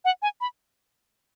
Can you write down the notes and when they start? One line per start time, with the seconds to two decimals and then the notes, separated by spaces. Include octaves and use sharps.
0.05 F#5
0.22 G#5
0.41 B5